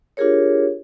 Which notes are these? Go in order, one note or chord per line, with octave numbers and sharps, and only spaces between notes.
D4 F4 G4 G#4 A#4 C#5